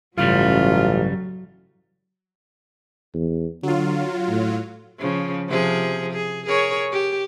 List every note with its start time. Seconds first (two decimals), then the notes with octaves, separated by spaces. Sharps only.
0.18 A1 G2 C#3 F#3 G3 F4
3.14 E2
3.63 D3 F#3 F4
4.29 A2
4.99 C#3 F3
5.48 C3 F3 G#4
6.13 G#4
6.46 G#4 A#4 C#5
6.92 G4